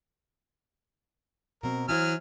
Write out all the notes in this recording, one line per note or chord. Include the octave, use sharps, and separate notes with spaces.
B2 C4 A#4
E3 F#3 E4 C5 G#5 F6